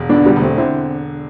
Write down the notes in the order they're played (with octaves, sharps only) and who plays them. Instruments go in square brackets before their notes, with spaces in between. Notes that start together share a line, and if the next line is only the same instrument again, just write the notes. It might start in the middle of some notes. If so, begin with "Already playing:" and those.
Already playing: [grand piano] E1
[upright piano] B3 D4
[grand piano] D3
[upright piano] G3 B3
[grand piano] E1
[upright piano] A3 C4
[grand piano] D3 [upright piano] C4 E4